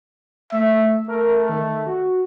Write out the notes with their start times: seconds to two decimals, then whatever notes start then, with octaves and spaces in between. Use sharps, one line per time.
0.52 A3 E5
1.08 A3 A#4
1.49 D#3
1.86 F#4